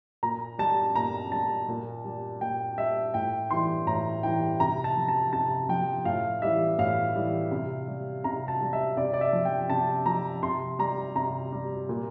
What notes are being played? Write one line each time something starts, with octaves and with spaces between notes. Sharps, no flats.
A#2 A#5
G3 A5
A#2 A#5
G3 A5
A#2
G3
A#2 G5
G3 E5
A2 G5
E3 G3 C6
A2 A#5
E3 G3 G5
C3 A#5
A5
F3
A5
C3 A5
F3 G5
A2 F5
E3 G3 E5
A2 F5
E3 G3
C3
G3
C3 A#5
A5
G3
E5
C3 D5
D5
E5
F3
G5
C3 A5
F3 A#5
C3 C6
G3 A#5
C3 A#5
G3
A#2